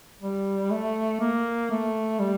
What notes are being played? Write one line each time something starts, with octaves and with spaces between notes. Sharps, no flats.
G3
A3
A#3
A3
G3